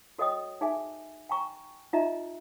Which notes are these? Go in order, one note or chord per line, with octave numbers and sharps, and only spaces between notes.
F#4 A4 C#5 D#5 G5 D#6
D#4 G#4 E5 G#5
G5 G#5 A#5 C#6
D#4 F4 G4 D#5 E5 A#5